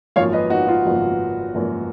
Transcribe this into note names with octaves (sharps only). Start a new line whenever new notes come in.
G#1 F#2 F3 A#3 C#5 F5
B4 D#5
D#4 F#4
F4
G#1 F#2 F3 A#3
G#1 F#2 F3 A#3